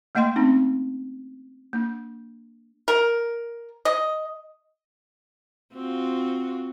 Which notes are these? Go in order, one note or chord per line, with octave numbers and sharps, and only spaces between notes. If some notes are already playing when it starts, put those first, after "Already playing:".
A3 A#3 D#5 F#5 G5 C6
A3 C4 C#4 D#4
A#3 D4
A#4
D#5
C4 F4 F#4